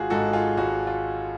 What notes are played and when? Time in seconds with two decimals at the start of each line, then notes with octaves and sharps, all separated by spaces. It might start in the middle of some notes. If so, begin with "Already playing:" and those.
Already playing: G#1 F4 F#4 G#4
0.10 G#2 G#3 F#4 A4
0.33 F4 G#4
0.57 G#1 F#4
0.87 F4